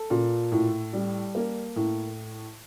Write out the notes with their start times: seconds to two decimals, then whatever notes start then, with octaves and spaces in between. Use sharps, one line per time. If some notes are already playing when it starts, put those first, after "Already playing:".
Already playing: A4
0.10 A#2
0.52 A2
0.93 G3
1.35 A#3
1.76 A2